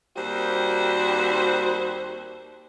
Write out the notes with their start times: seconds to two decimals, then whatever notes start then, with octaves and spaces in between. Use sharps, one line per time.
0.16 D#2 G3 C4 F#4 C5